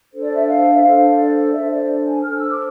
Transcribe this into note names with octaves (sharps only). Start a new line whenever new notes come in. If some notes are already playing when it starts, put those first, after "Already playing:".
D4 A4 C5
D5
E5
F5
E5
D4 A4 C5 F5
D5
D4 A4 C5 E5
D5
G#5
D4 A4 C5 F6
E6
D6